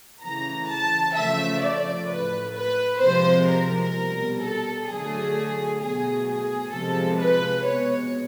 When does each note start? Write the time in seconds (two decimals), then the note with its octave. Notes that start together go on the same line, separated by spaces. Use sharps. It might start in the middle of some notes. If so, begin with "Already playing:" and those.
0.23 C#3 E3 A3 A#5
0.70 A5
1.15 C#3 F3 A3 E5
1.62 D5
2.08 A2 F#3 A3 B4
2.55 B4
3.01 C3 F3 G#3 C5
3.47 A#4
3.94 B2 G3
4.40 A4
4.87 D3 F#3 A3 G#4
5.79 B2 F#3 A3 G#4
6.26 G#4
6.72 C3 F3 G#3 A4
7.19 B4
7.65 B2 G#3 C#5